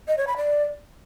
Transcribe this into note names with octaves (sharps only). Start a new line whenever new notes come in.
D#5
C#5
B5
D5